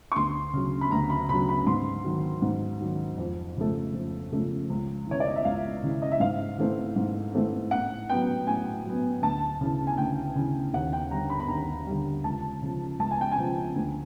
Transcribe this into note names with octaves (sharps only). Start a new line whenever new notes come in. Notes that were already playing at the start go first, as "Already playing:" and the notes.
C#6
D2 C6
C#3 F#3
B5
D2 A#5
B5
C#3 F#3 B5
B5
G#2 C6
D#3 F#3
G#2
D#3 F#3
F2
C#3 F3 A3
F2
C#3 F3 A3
C#2
C#3 E3 C#5
D5
D#5
E5
C#2 F5
C#3 E3
D#5
E5
G#2 F5
E3 A3 C4
G#2
E3 A3 C4
A2 F#5
F#3 B3 G5
A2 G#5
F#3 B3
D2 A5
C#3 E3
G#5
D2 G5
C#3 E3
D#2 F#5
G5
D3 G3 A#5
B5
B5
D#2 A#5
D3 G3
C#2 A5
C#3 F3
C#2 A5
G#5
G5
G#5
C#3 F3
D2